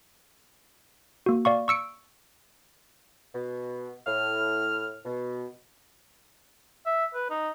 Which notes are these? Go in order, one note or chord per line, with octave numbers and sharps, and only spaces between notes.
A#3 F#4
D5 F5 C#6
C#6 E6 C#7 D7
B2
A2 F6
B2
E5
B4
D#4